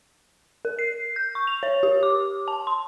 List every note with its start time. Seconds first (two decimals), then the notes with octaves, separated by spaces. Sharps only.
0.65 A#4
0.79 C7
1.16 G6
1.35 C#6
1.47 F7
1.63 C#5
1.83 G4
2.03 D6
2.48 A5
2.67 C6